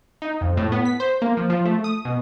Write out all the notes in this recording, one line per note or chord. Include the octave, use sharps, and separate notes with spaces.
D#4
F2
A2
B3
B6
C5
A#3
F3
F3
A3
D#6
B2